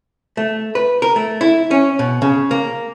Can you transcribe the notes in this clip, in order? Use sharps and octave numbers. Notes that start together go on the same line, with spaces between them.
A3
B4
A#4
A3
E4
C#4
B2
C#3
A#3